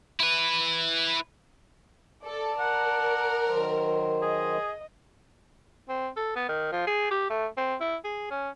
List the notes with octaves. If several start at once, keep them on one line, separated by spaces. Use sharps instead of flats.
E4 B4
A4 D5 A5
A#4 F#5
D#3 F#3 C5
G#4 D#5
C4
A4
B3
D#3
F3
G#4
G4
A3
C4
E4
G#4
C#4